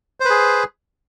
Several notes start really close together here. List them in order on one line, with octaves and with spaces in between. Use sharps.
C5 B4 G#4